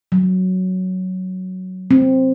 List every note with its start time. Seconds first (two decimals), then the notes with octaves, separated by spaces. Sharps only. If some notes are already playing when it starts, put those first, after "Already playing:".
0.12 F#3
1.91 C4